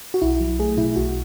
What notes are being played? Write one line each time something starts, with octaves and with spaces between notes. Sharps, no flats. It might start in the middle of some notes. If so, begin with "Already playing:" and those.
F#4
B1 E4
F#3
A3 G#4
B2 E4
B1 F#4